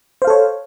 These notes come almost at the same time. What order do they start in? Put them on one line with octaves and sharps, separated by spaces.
C5 F5 A4 C#5